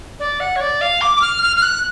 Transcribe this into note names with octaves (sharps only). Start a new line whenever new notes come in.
D5
F#5
C#5
D5
F5
D6
D6
F6
F6
F6
F#6